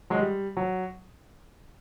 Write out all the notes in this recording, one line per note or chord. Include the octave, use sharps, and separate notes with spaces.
F#3 G#3
G3
F#3